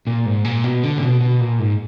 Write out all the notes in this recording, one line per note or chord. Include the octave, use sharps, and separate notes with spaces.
A#2
G#2
A#2
B2
D3
A#2
B2
B2
A#2
G#2